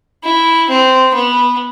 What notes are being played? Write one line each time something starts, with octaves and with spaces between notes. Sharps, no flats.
E4
C4
B3